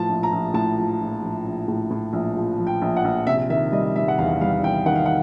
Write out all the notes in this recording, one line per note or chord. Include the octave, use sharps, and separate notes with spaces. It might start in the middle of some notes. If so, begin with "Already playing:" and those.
Already playing: A2 F3 A5
A#1
A#5
A#1
A2 A5
F3
A#1
A#1
A#1
A2
A2
A#1
F3
F3
G5
A#1
F#5
A#1
C3 E5
D#3 E5
G3 D#5
G3 E5
F#5
E2 F5
G3 F5
E2 G5
D#3 F#5
F5
F#5